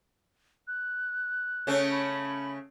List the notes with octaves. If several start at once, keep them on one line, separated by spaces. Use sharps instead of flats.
F#6
C#3 A3 C#4
B5